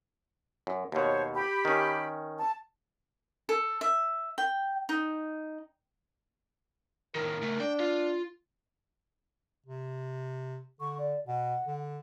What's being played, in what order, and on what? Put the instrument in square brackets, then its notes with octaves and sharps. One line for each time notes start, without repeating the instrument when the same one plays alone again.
[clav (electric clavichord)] F#2
[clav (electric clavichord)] D#2 B2 [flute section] C5 C#5
[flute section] G4 B5
[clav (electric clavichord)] D#3 C#4
[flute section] A5
[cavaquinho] A4
E5
G5
D#4
[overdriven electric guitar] A2 D#3 [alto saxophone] A#4
[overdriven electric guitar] C#3 A3
[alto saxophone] D4 [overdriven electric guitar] G5
[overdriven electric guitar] F4
[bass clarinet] C3
[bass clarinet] D3 [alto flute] C#6
[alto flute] D5
[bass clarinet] B2 [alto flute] F#5
[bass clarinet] D3